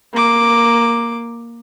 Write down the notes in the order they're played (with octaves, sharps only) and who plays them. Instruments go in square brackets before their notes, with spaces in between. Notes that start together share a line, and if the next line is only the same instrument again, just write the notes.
[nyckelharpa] A#3 D6